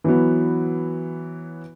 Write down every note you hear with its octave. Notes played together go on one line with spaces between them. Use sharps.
E3 F#3 B3